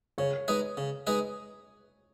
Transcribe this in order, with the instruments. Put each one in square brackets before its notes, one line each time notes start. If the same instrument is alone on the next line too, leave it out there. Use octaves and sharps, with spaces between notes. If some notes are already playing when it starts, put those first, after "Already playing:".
[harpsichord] C#3 [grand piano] C#5
[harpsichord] G#3 D#4 G#4 B4
C#3
G#3 D#4 G#4 B4